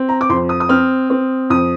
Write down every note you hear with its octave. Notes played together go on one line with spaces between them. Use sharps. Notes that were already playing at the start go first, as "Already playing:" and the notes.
Already playing: C4
A#5
D6
F2 C6
D#6
D#6
C4 F6
C4
F2 D#6